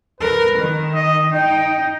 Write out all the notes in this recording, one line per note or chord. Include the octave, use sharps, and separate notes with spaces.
A#4 B4
D#3
D#5
D#4 G5